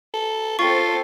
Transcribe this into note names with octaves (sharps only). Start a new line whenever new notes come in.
A4
C4 F4 A4 C5 C#6